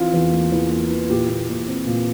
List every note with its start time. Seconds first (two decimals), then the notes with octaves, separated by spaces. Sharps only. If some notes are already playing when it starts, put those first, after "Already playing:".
Already playing: E3 C4 F4
0.13 E2
0.32 A#3
0.51 E2
0.70 A#3
0.90 E3
1.09 A#2 G4
1.29 A#2
1.49 A#2
1.68 C4
1.86 A#2